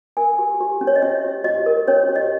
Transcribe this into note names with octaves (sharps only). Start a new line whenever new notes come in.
A#4 G#5
G4
G4
C#4
C#5
D#5
C#4 E5
G4
G4 D#5
A#4
C#4 C#5
G4
D#5